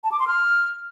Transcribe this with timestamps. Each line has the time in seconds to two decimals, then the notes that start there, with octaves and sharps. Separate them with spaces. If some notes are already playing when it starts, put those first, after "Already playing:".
0.04 A5
0.12 D6
0.19 C6
0.27 F6